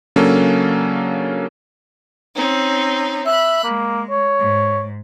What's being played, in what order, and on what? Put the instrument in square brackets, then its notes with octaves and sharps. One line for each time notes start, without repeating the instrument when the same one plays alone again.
[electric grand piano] C#3 F#3 A#3 C#4 D4 A4
[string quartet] C4 C#4 D#4
[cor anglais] E5 [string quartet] B5 F#6
[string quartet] G#3 [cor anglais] A#3
[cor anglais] C#5
[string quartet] G#2